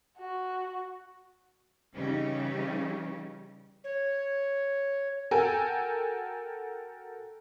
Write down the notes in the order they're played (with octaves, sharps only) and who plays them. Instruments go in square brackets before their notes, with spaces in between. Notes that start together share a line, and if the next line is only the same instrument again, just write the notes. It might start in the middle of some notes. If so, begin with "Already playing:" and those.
[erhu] F#4
[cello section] C#3 E3 G3 C#4 D#4 G4
[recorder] C#5
[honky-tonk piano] F#4 A4 A#4 G5 G#5